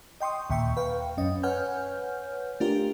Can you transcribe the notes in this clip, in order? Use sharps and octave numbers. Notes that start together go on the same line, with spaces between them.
D#5 G5 C6 C#6 D#6
D#2 A#2 E5 G5 C#6
B4 F5 G5
F#2 C#4 D#5
B4 C#5 F#5 G#5 F6 G6
A3 D4 F4 G4 A#4